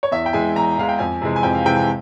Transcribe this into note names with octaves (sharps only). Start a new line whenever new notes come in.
C#5
E2 E5
G5
E3 G#3 G#5
E2 A#5
E3 G#3 F5
G5
F2 G#5
C3 E3 G#3
G#5
F2 G5
F5
C3 E3 G#3 G5
G#5